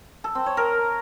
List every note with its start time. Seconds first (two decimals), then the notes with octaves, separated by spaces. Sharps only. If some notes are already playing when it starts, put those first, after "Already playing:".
0.24 A4
0.35 C4
0.46 C#5
0.57 A#4